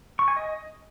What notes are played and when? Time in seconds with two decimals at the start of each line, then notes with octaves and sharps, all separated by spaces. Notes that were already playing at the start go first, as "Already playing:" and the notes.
0.19 C#6
0.28 G#5
0.36 D#5